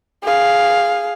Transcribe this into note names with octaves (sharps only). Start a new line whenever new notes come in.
G#4 F5